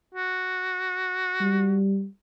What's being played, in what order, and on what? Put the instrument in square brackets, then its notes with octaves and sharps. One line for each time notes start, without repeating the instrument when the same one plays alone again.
[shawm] F#4
[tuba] G3